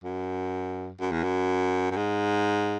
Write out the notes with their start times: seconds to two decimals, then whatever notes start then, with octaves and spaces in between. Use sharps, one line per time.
0.04 F#2
1.00 F#2
1.12 E2
1.23 F#2
1.91 F#2
1.97 G#2